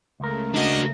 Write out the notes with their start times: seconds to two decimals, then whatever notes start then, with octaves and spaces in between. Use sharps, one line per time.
0.20 C#2 C#3 A3 A#4
0.55 D4 F#4 D#5